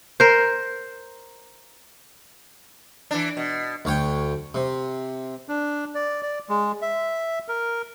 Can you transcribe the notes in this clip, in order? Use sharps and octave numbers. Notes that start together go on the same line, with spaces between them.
A#4 C5
E3 D4
B2
D2 C#5 G5
C3
D4
D5
D5
G#3
E5
A#4